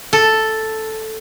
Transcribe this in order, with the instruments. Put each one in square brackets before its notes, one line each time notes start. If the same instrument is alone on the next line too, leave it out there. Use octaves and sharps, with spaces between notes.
[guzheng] A4